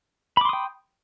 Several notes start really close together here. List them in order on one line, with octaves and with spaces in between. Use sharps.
B5 D6 C6 D#6 G5